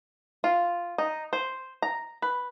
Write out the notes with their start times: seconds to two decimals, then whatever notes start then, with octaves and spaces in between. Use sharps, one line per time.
0.44 F4
0.98 D#4
1.33 C5
1.82 A#5
2.22 B4